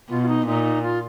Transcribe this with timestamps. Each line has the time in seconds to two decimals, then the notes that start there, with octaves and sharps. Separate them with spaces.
0.10 B2 F4
0.22 F4
0.28 D#4
0.46 A#2 D#4
0.83 F4